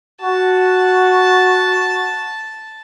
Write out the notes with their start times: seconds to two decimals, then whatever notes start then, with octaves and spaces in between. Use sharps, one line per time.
0.21 F#4 A5